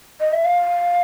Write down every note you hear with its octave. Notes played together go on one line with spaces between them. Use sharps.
D#5
E5
F5